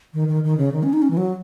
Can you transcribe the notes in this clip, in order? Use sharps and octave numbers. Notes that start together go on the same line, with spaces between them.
D#3
D#3
D#3
C#3
D#3
C#4
D#4
C#4
E3
F#3